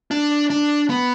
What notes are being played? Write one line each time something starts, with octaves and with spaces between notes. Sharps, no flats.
D4
D4
B3